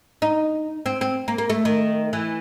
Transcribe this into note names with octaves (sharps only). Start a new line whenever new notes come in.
D#4
C4
C4
A#3
A#3
A3
D#3
E3